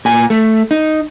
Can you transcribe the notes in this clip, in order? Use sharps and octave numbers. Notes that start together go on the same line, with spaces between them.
A#2 G#5
A3
D#4